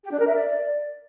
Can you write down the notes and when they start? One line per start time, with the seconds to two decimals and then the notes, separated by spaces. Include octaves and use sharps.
0.04 G4
0.11 D4
0.19 A#4
0.27 E5
0.35 D5